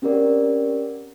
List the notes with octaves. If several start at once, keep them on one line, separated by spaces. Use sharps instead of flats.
C4 C#4 G4 A#4 D5